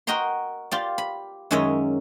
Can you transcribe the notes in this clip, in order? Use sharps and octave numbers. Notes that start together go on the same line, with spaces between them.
F#4 A#4 D#5 G5 A#5 C6
F4 G4 D5
B5
F#2 D#3 G#3 C#4 D#5 E5